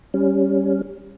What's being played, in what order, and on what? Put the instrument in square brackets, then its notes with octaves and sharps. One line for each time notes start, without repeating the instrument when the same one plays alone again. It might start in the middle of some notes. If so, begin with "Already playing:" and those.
[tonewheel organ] G3 C#4